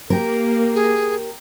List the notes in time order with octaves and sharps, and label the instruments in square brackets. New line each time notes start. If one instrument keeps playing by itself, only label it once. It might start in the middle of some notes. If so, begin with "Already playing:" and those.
[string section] A#3 [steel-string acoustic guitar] G4 A#4
[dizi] G#4